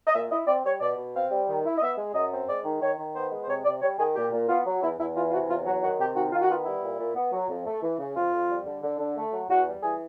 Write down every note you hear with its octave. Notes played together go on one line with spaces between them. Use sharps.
D#5
A#2 E5
E4 D#5
C4 D5
G3 C#5
B2 D5
B2
C4 F5
G3
D#3
E4
D#5
B3 E5
G#3
F#2 D#5
C4
G#3 D5
D#3
D#3 C#5
D#3
B3 C5
G#3
C5
C3 C#5
C3 D5
G3 C#5
D#3 G#4
A#2 G4
A#2
B3 F4
F#3
E2 E4
E2 E4
E3 F4
F4
C3 F#4
E2 F4
F#3 F#4
D#3 F#4
C3 G4
D#3 F#4
D#3 F4
F#4
B3 F4
G3 E4
A#2
A#2
B3
F#3
F2
A3
E3
C#3
F2 F4
F2
G3
D3
D3
D3
A3
F#3
E2 F#4
G3
E3 G#4